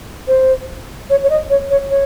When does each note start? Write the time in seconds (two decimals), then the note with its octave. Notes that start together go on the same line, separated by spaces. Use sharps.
0.28 C5
1.10 C#5
1.24 C#5
1.30 D#5
1.50 C#5
1.70 C#5
1.90 C#5